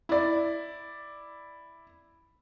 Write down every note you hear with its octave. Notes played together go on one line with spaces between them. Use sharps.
E4 D5